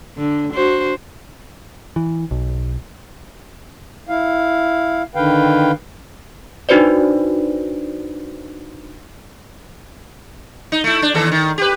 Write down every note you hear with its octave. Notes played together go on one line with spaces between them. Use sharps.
D3
D4 F#4 C5
E3
B1
E4 F5
D3 D#3 B4 F5 G5
D4 D#4 F#4 B4 C5 D5
D#4
A3 E4
D4
D#2 E3 A4
D#3
G4 B4